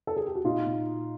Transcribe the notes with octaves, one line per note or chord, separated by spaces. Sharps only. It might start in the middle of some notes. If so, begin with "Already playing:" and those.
A4
G#4
G4
F#4
A#2 D#4 F4
A#2